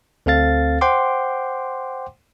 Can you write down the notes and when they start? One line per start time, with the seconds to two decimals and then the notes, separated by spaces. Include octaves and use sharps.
0.26 D2 C4 A4 F5 A6
0.81 C5 F#5 G5 C6 D6